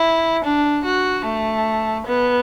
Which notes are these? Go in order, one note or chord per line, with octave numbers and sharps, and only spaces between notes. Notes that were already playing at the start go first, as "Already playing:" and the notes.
Already playing: E4
D4
F#4
A3
B3